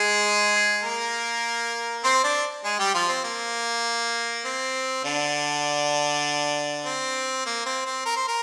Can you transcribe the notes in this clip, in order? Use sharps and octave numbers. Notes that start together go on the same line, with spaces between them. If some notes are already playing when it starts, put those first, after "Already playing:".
Already playing: G#3 G#4
A#3 A#4
C4 C5
D4 D5
G#3 G#4
G3 G4
F3 F4
C4
A#3
C4
D3 D4
C4
A#3
C4
C4
A#4
C5
A#4